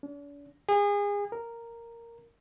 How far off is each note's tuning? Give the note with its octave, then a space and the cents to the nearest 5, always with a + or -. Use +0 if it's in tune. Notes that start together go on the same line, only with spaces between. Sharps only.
D4 -45
G#4 -30
A#4 -5